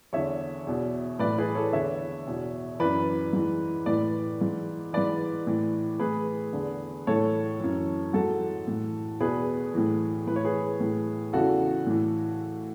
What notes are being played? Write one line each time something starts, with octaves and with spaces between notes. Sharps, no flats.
E2 D3 C#5 E5
E2 B2
A2 E3 B4 D5
G#4 B4
A4 C#5
E2 D3 C#5 E5
E2 B2
F#2 E3 B4 D5
G#2 E3
A2 E3 B4 D5
G#2 E3
G#2 E3 B4 D5
A2 E3
A2 E3 G#4 B4
E2 D3
A2 E3 A4 C#5
F#2 E3
G#2 E3 F#4 A4
A2 E3
E2 B2 G#4 B4
A2 E3
A2 E3 B4
C#5
G#4 B4
A2 E3
E2 C#3 E3 F#4 A4
A2 E3